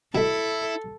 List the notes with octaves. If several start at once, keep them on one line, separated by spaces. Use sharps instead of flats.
B2 A3 E4 A4